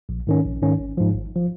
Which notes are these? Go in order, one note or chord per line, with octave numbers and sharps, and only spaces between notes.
A#1
G#2 D#3 C#4
A#1
G#2 D#3 C#4
G#1
G#2 F3
G#1
F3